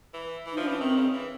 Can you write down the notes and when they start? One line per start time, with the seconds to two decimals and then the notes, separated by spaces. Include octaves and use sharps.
0.14 E3
0.46 E3
0.53 D#4
0.57 F3 D4
0.67 E3 C#4
0.81 D#3 C4
0.97 C#3
1.13 E3